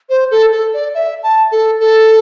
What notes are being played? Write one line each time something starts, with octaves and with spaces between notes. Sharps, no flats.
C5
A4
A4
D5
E5
A5
A4
A4